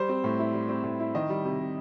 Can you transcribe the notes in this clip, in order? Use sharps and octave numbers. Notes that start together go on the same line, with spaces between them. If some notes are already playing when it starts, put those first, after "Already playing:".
Already playing: G3 C5
C4
A2
E4
G3
C4
A2
E4
D#3 D#5
G3
C3
C3